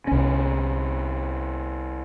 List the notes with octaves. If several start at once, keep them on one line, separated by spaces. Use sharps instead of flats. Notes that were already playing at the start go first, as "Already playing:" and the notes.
C2 C#4